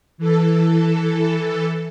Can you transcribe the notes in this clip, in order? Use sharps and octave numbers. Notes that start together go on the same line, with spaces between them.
E3 A4